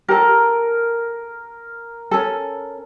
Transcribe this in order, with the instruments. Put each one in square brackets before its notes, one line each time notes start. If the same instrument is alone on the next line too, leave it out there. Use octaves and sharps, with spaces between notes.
[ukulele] G4 A4 [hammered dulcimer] A#4
[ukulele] C#4 A4